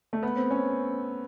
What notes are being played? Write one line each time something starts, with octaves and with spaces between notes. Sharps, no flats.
A3
B3
C4
C#4